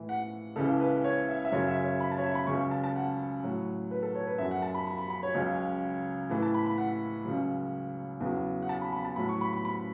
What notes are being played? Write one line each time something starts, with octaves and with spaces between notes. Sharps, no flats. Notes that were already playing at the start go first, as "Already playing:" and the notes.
Already playing: A2 E3
F#5
C#2 C#3 E3 A4
B4
C#5
E5
E5
F#2 C#3 F#3 C#5
E5
C#5
B5
A5
C#5
E5
B5
C#2 C#3 F#3 C#6
A5
A5
F#5
A2 F#3
B4
A4
C#5
B4
F#2 F#3 E5
F#5
A5
B5
B5
B5
B5
C#5
C#2 C#3 F#3
A2 E3 A4
A5
B5
B5
F#5
C#2 C#3 F#3
E2 C#3 F#3
F#5
A5
B5
B5
A5
A2 F#3 B5
C#6
B5
B5
B5